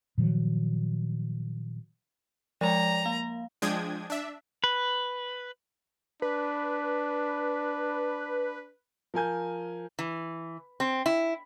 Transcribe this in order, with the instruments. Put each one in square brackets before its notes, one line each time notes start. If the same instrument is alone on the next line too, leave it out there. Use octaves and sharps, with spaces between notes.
[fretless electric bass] A#2 D#3 F3 F#3
[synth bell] F3 G#3 [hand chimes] D5 G5 [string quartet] A#5
[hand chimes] A#3 [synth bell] F5
[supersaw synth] F3 G#3 D4 G5 D#6 G#6
D4 E5
[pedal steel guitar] B4
[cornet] D4 [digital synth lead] B4
[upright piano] F3 A#4 G#5 G6
[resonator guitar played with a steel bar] E3
C4
E4